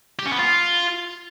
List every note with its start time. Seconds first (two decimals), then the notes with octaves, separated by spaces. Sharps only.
0.19 G4
0.26 C#4
0.32 B3
0.39 F4